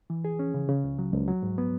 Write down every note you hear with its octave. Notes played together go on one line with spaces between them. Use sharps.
E3
G#4
C#4
C#3
C#3
C#2
F#3
C#2
F#3
G#2
B3